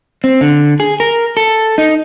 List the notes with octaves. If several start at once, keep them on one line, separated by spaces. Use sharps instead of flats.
C4
D3
G#4
A#4
A4
D#4